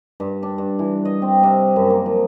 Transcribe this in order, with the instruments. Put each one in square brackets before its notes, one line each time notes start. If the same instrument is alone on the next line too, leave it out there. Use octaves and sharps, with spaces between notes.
[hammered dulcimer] G2
D4
G2
E3
D#5
C4
C3
F#2
A#3
F3